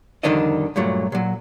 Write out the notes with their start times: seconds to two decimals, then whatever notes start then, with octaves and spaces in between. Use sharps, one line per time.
0.23 C2 F2 D3 D#3 D4 D#5
0.76 G2 A#2 F#3 A3
1.12 A#2 F#3